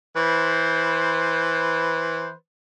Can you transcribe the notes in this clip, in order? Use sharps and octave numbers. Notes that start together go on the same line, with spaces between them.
E3 B4 C5